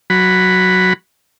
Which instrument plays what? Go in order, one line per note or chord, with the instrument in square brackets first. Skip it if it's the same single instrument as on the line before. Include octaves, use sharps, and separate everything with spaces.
[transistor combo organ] F#3 B5